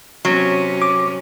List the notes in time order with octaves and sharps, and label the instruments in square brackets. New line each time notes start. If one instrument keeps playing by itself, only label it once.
[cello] C3 C#4 [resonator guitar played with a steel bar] F#3
[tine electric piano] D6